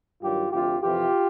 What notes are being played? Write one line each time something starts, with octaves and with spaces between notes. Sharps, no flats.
G2 D#3 F#3 F4 G4
D2 C3 F3 F4 G4
F2 C3 E3 F4 G4